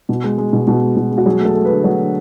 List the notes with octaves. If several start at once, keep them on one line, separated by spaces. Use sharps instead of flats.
B2
G#3
G#3
B2
B2
G#3
B2
G#3
F#4
F#3 G#4
A3 A4
A3
B4
D3
F#3
D3